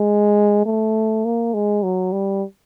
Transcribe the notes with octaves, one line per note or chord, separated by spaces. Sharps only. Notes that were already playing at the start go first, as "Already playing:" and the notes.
Already playing: G#3
A3
A#3
G#3
F#3
G3